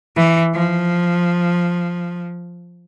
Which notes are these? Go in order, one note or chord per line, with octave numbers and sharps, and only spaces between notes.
E3
F3